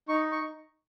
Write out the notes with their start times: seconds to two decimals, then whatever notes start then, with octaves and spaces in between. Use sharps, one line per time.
0.08 D#4 C#6
0.32 C#6